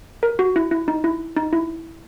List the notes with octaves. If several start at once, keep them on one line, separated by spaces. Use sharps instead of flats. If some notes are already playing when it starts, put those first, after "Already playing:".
A#4
F#4
E4
E4
D#4
E4
D#4
E4